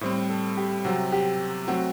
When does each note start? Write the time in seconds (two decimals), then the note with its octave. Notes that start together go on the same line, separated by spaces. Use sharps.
0.01 A2 G3 C4 C5
0.29 A4
0.57 G4
0.85 C3 F#3 C4 F#4
1.12 G4
1.67 F#3 A3 C4 F#4